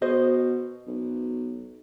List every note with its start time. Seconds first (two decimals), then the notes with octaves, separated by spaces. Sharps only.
0.02 B2 C5 D#5
0.87 B1